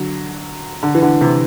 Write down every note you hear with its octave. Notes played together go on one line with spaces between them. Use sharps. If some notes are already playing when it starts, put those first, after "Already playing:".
Already playing: D3 F#3
D3
E3
D3
C3 E3